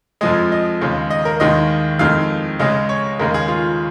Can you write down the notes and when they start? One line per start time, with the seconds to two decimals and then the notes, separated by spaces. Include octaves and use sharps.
0.21 F2 F3 G#3 D#5
0.52 D#5
0.81 D#2 C#3 G#3
1.10 D#5
1.25 A#4
1.40 D#2 D#3 G#3 D#5
1.99 F2 D#3 G#3 F5
2.59 C#2 C#3 G#3 D#5
2.89 C#5
3.20 D#2 C#3 G#3 A#4
3.34 G#4
3.48 F4